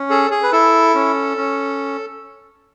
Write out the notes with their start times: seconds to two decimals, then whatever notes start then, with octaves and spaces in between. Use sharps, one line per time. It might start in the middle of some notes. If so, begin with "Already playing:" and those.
Already playing: C#4
0.10 G#4 A4
0.31 G#4
0.43 B4
0.52 E4 A4
0.95 C#4
1.37 C#4